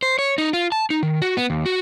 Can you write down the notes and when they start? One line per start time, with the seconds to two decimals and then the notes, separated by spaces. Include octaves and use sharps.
0.03 C5
0.19 C#5
0.38 D#4
0.53 F4
0.72 A5
0.90 D#4
1.03 D#3
1.22 F#4
1.37 B3
1.50 D#2
1.66 F#4